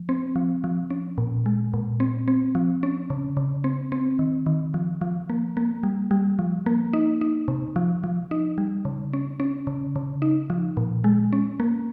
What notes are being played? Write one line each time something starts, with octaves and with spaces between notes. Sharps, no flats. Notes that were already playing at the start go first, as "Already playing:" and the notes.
Already playing: F3
C4
F3
F3
C#4
A#2
G#3
A#2
C4
C4
F3
C#4
C#3
C#3
C4
C4
D#3
D#3
F3
F3
A#3
A#3
G3
G3
F3
A#3
D#4
D#4
C3
F3
F3
D#4
G3
C#3
C#4
C#4
C#3
C#3
D#4
F3
A#2
G#3
C#4
A#3